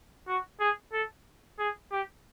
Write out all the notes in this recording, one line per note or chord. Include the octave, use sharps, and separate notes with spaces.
F#4
G#4
A4
G#4
G4